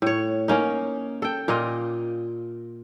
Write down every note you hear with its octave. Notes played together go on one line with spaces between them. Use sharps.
A2 C#5
A#3 C#4 D#4
A4 G5
A#2 A#3 F4 D#5